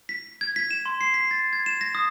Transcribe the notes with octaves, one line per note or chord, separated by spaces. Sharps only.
B6
G#6
B6
E7
C6
C7
B6
A6
G#6
E7
A#6
D#6